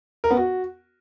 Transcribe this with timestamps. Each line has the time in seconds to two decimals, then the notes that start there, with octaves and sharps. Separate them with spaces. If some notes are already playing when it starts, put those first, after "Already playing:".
0.24 A#4
0.30 B3
0.37 F#4